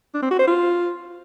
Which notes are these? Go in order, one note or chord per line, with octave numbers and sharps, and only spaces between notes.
D4
C4
F#4
C5
F4